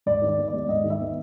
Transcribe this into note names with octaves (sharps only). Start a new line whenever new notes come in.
G#2 D5
D#3
D5
B3
D5
G#3
G#2 D#5
D#3
E5
B3